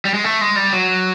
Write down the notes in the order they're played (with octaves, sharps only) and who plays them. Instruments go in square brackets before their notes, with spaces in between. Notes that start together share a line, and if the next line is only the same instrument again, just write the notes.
[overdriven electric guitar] G3
G#3
A3
G#3
G3
F#3